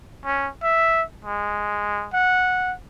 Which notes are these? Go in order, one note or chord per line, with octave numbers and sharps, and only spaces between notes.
C#4
E5
G#3
F#5